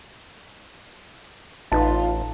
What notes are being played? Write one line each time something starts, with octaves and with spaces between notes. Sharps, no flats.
A1 D#4 F4 B4 A5